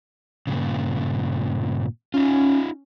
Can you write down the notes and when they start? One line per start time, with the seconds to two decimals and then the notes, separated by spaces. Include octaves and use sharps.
0.47 G2 A#2 C#3
2.14 C#4 D#4 F4